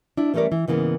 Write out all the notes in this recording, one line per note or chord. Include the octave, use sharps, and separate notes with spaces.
D4 E4
E3 G3 A3 C#4 A#4 D5
E3
G#2 C#3 E3 A#3 B3